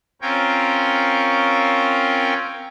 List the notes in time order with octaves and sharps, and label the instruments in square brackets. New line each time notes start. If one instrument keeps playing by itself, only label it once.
[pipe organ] C4 C#4 F4 A#4 C#5 G5